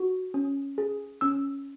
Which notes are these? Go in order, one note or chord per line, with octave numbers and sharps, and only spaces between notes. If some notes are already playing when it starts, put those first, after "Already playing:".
Already playing: F#4
C#4
G#4
C#4 E6